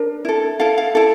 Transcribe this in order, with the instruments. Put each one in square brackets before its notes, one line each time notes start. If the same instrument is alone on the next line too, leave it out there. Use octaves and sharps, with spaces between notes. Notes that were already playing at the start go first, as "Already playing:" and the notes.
Already playing: [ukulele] D4 A#4
E4 A4
E4 A4 F5
F5
E4 A4